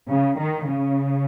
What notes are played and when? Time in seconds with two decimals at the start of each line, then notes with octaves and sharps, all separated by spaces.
0.10 C#3
0.40 D#3
0.70 C#3